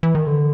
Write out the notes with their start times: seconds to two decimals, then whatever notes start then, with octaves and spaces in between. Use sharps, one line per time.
0.03 E3
0.15 D#3
0.27 D3